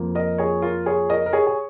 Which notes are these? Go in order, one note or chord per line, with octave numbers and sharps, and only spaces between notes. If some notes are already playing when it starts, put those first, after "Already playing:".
Already playing: F2 F3 A#3
A#4 D#5
G#4 C#5
F4 A#4
G#4 C#5
A#4 D#5
A#4
G#4 C#5
G#4